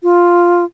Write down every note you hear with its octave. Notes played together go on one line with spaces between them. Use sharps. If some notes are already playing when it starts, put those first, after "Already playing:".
F4